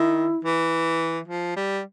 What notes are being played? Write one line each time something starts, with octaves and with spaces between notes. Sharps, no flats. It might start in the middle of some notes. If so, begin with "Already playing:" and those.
Already playing: D#3 E4
E3
F3
G3